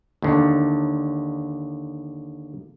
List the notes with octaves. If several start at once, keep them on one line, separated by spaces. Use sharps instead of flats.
D#2 D3